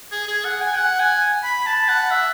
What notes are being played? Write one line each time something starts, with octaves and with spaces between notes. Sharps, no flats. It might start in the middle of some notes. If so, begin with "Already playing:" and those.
G#4
G#4
F#5
G#5
F#5
G#5
B5
A5
F#5
E5